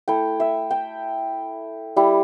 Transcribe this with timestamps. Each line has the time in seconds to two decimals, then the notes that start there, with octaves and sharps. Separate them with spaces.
0.08 A3 E4 G5
0.40 E5
0.71 G5
1.96 G3 E4